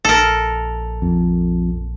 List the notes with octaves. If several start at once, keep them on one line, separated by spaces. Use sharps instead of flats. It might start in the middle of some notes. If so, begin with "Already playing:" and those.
A#1 A4 A#4
F2